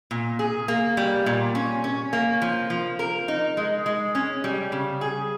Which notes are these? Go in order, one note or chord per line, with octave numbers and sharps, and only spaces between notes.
A#2
G#4
A#3
G3
A#2
C#4
C#4
A#3
F3
F3
A#4
D#4
G#3
G#3
C#4
G3
C#3
G#4